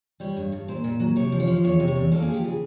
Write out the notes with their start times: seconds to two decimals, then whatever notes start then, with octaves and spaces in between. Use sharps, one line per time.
0.20 G3 C#5
0.37 G2
0.52 G2
0.68 A#2 C5
0.84 A#2
1.00 F#3
1.16 C3 C#5
1.32 F3
1.40 C#5
1.48 F3
1.64 E2 C#5
1.80 C3
1.88 C#5
1.96 E2
2.12 A#3 A4
2.22 G#4
2.28 F3
2.34 G4
2.44 C#3 G#4